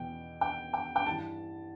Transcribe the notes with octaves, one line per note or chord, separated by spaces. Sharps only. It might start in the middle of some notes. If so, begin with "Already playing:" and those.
Already playing: E2 B2 G5
G5
G5
G5
G2 E3 A5